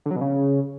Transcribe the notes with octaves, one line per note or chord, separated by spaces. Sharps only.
D3
F#3
B2
C#3